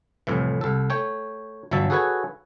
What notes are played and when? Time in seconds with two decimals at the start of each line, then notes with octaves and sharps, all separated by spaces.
0.27 C2 F2 A2 E3
0.61 C2 A4
0.90 A3 C#5 G5
1.71 G1 B2 E3 F#3 E5 A5
1.90 F#4 G#4 A4 B4 C#5 G#5